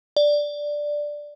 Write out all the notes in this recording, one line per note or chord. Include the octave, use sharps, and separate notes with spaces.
D5